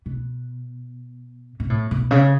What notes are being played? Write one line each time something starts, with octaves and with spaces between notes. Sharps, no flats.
B2
B2
A2
B2
C#3